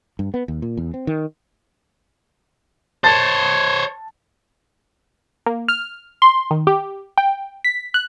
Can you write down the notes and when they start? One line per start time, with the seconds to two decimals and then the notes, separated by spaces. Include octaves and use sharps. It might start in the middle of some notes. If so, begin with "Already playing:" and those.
0.19 G2
0.34 B3
0.48 D#2
0.62 A#2
0.77 E2
0.94 C4
1.07 D#3
3.04 C5 C#5 A5 A6
5.46 A#3
5.68 F6
6.22 C6
6.51 D#3
6.67 G4
7.18 G5
7.64 B6
7.94 F#6